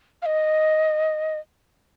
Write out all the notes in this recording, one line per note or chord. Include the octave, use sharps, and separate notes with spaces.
F5
D#5